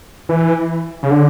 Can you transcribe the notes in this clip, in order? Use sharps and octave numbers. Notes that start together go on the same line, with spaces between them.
E3
C#3
D3